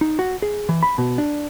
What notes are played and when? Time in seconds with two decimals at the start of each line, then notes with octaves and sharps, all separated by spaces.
0.01 D#4
0.19 F#4
0.42 G#4
0.69 E3
0.83 B5
0.98 B2
1.18 D4